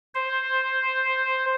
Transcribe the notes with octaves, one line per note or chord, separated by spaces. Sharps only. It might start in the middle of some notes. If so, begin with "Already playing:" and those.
C5